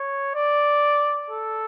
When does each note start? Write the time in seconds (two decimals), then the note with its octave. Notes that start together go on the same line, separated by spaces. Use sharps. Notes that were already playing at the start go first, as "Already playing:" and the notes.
Already playing: C#5
0.35 D5
1.30 A4